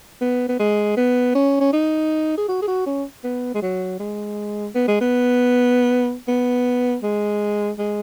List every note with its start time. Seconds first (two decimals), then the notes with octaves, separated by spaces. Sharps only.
0.21 B3
0.49 B3
0.59 G#3
0.97 B3
1.35 C#4
1.61 C#4
1.73 D#4
2.38 G#4
2.48 F#4
2.62 G#4
2.68 F#4
2.86 C#4
3.24 B3
3.54 G#3
3.62 F#3
4.00 G#3
4.75 B3
4.88 G#3
5.01 B3
6.28 B3
7.03 G#3
7.79 G#3